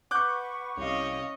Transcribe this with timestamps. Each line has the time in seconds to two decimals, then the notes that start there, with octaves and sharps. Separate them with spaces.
0.11 B4 F#5 C#6 D6 F#6 G6
0.77 C2 C#4 G4 C#5 D#5 F5